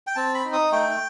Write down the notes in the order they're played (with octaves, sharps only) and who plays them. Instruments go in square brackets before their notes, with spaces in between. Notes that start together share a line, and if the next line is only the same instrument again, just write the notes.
[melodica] G5
C4 A5
B5
D#4
D#6
A3 G5